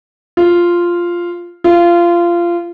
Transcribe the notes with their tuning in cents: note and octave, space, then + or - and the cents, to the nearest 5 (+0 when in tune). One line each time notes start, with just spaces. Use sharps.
F4 -5
F4 -20